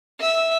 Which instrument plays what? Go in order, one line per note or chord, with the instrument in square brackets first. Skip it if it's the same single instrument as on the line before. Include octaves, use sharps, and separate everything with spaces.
[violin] E5